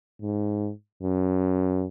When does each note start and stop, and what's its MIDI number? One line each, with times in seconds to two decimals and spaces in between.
0.22 0.71 44
1.03 1.86 42